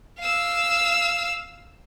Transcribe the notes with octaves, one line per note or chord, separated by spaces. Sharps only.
F5 E6